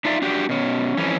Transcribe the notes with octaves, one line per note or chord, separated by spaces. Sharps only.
D4 D#4 F4 D5 E5
D4 F#4 G4
B2 C#4
F2 E3 C#4